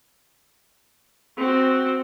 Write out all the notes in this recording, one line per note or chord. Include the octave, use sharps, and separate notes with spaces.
C4 F#4